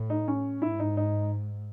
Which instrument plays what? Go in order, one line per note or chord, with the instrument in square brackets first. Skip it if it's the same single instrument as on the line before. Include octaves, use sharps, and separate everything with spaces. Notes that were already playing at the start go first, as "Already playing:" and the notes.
Already playing: [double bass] A2
[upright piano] D#4
C#4
[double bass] G#2 [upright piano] E4
[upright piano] D#4
D#4